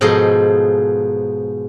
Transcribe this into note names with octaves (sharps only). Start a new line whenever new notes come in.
G#2 B2 F3 G#4 A4 D#5